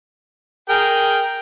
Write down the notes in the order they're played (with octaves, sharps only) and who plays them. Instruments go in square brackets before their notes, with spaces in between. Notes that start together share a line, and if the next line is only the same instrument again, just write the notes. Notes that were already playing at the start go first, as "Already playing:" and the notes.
[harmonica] G#4 A#4 G5